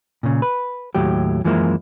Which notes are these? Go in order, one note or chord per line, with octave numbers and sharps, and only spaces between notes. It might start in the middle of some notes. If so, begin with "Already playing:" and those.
A#2 C#3
B4
D#2 A2 F#3 G4
F#2 E3 F3 G#3 A#3 E4